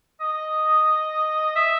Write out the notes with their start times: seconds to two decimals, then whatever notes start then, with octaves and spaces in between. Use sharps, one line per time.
0.21 D#5
1.56 E5